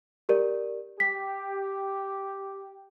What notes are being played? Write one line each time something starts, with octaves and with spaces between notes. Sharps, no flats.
G4 A#4 D5
G4 B6